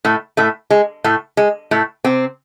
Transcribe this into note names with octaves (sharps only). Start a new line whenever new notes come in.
A2 A3
A2 A3
G#3
A2 A3
G#3
A2 A3
C3 C4